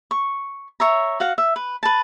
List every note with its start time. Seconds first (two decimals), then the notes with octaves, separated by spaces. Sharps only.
0.11 C#6
0.80 C#5 E5 A#5
1.20 F#4 F5 F#5
1.38 E5
1.56 B4
1.83 B4 A5